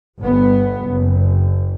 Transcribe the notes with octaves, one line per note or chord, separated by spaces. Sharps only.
G1 G2 B3
F#1